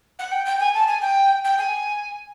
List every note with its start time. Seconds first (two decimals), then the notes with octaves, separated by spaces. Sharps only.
0.18 F#5
0.31 G5
0.45 G5
0.59 G#5
0.73 A5
0.87 G#5
1.01 G5
1.44 G5
1.58 G#5